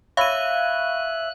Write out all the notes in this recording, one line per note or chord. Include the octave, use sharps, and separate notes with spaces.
C#5 E5 F5 B5 F#6 D#7